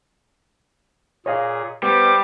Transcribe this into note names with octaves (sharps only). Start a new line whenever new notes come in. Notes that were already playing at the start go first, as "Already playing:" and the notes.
A#2 G#4 C#5 D#5 F5
G3 B3 C5 D6